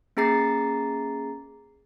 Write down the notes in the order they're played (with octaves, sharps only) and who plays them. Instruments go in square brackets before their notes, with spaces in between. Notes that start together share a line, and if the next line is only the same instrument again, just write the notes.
[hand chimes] A#3 C#4 G#4 A#5 A6 C7